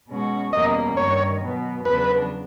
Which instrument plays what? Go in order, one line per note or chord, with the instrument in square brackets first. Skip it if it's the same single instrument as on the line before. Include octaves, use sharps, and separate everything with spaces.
[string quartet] B2 G#3 C#4 F#4
[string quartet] E2 B2 G3 A#3 C#4 [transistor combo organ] D#5
[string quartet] G2 D#3 G3 [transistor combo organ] C#5
[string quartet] B2 F#3 B3
[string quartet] E2 C#3 F#3 B3 D4 [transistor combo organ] B4